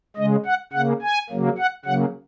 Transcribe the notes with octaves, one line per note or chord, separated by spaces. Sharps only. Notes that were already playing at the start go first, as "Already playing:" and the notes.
C#3 G#3 D#5
F#5
C#3 A#3 F#5
G#5
C#3 F#3 A#3
F#5
C#3 F#3 A#3 F#5